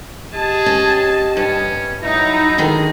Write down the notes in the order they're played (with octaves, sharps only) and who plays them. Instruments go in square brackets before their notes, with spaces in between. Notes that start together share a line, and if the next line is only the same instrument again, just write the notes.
[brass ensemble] G4 D#5 [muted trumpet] G#4 [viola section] A5
[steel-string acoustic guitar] C#4
[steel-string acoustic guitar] G2 [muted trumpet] C#4
[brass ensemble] F#3 E4 [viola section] D#4 [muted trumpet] A#5
[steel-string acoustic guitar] D3 D#3 G#4